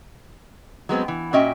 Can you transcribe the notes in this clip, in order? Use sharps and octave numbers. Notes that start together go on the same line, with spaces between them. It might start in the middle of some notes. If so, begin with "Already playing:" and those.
F#3 G#3 B3 C4
E3
A#2 C#4 F#4 D#5 E5 G5